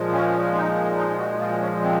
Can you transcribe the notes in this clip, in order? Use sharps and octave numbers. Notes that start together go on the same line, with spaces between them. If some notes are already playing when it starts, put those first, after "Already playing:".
Already playing: A#2 F3 G#3
C#4
D#4
D#4
F#4
F4
C#4
C4